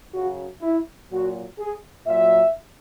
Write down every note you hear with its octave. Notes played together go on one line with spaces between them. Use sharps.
F#2 C#3 F#3 F#4
E4
A#2 F#3 F#4
G#4
A#2 F#3 E5